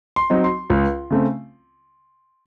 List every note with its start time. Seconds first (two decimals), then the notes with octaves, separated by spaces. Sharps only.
0.16 C6
0.30 F#3 C4 D#4
0.44 C6
0.70 C#2
1.11 C#3 A3 C4